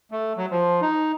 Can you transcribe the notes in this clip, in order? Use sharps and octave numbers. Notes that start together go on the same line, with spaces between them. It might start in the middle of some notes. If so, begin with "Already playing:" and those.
A3
F#3
F3
D#4